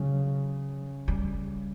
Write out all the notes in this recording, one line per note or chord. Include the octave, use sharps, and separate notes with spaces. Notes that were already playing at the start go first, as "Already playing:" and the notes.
Already playing: C#3 F#3
G3